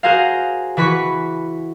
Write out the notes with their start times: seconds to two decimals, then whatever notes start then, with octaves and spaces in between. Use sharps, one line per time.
0.03 F#4 G#4 A#4 C5 F5
0.77 E3 F#4 B4 B5 C#6 B6